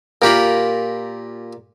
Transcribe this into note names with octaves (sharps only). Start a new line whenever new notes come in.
A#2 F4 G4 A#4 B5